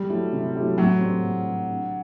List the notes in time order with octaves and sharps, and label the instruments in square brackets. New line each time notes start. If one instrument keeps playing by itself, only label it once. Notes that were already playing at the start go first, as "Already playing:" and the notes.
Already playing: [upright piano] G3
[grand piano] F#3 A3 E4 G4
C3
F#3 A3 E4 G4
[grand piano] A2 [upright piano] F#3
[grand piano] G3 C4
A2
G3 C4
D3